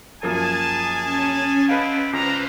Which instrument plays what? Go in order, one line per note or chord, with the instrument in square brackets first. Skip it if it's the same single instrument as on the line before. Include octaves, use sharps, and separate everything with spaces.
[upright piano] F#2 F3 A#3 [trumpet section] G#4 G#5 A5
[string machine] C#4
[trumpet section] B3 C4 E4 [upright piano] B4 D#5 F5
[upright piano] C#2 [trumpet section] D4 F5 A#5 [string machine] B4 C5